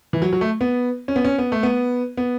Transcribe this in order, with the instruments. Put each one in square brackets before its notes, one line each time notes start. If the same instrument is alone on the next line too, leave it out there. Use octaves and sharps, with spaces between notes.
[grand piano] E3
F#3
F#3
A3
B3
C#4
B3
C#4
B3
A3
B3
B3